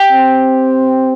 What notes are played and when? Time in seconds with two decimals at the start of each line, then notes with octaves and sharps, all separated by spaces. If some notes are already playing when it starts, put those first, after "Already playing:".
Already playing: G4
0.12 C4